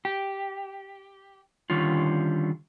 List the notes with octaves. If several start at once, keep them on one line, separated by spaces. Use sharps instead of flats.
G4
D3 D#3 G3 C#4 F4